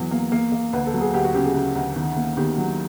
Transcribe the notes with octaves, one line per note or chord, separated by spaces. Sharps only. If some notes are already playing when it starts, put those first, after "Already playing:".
Already playing: E2 F#3
A#3
A#3
A#3
D2 B4
A4
F#3
G#4
D2 G4
F#4
C#3 G4
G#4
C#3
D2
D#3
A#3
D#3 G4
F#3